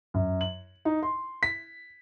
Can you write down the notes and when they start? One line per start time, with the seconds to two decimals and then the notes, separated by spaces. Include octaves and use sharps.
0.14 F#2
0.41 F#7
0.85 D#4
1.03 C6
1.43 B6